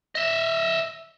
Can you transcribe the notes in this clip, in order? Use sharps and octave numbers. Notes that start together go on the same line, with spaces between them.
D#5 E5